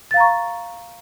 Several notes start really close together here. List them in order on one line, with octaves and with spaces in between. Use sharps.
A6 F5 A#5 C#6